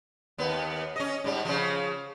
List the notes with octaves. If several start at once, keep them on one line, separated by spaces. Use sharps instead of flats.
D#2 B3
C#4 D#5
G#2 G3
C#3 F3